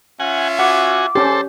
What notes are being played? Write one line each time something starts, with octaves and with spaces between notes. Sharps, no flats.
C#4 F4 E5 F#5 G#5
F#4 F#5 G#5 D6
C#4 G4 A4 C5